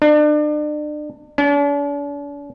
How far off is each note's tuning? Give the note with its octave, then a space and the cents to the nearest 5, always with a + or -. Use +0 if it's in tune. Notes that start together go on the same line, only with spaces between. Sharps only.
D4 +35
D4 -45